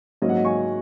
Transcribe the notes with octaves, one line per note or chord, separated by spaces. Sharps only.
G#2 F#3 A#3 C#4 D#5
F#5
D#5
G#5 C#6